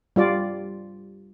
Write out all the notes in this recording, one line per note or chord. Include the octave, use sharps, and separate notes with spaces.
G3 F4 D5